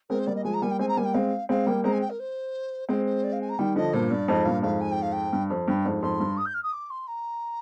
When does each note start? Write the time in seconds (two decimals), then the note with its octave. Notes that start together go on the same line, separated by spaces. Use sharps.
0.10 G#3 C4 A#4
0.19 C5
0.27 G3 A#3 D5
0.36 D#5
0.44 F3 G#3 G#5
0.54 A#5
0.62 G3 A#3 G#5
0.71 G5
0.79 G#3 C4 G#5
0.88 A#5
0.97 G3 A#3 G#5
1.05 G5
1.14 G#3 C4 F5
1.49 G#3 C4 F5
1.67 G3 A#3 G5
1.84 G#3 C4 A#5
1.93 G#5
2.01 G5
2.10 A#4
2.20 C5
2.89 G#3 C4 C5
3.06 C5
3.24 D5
3.33 F5
3.42 G#5
3.50 A#5
3.59 D#3 G3 G5
3.76 D3 F3 D#5
3.93 G2 A#2 C5
4.10 G2 D5
4.28 F2 G#2 D#5
4.45 G2 A#2 F5
4.63 F2 G#2 F5
4.81 G#5
4.92 G5
5.02 F5
5.12 G5
5.33 G2
5.50 F2
5.68 G2 G5
5.85 F2 G#2
6.03 F2 G#2 C6
6.20 G2
6.37 D#6
6.46 G6
6.54 F6
6.63 D#6
6.73 D6
6.90 C6
7.08 A#5